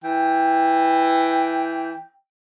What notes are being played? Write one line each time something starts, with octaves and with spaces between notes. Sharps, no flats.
E3 G5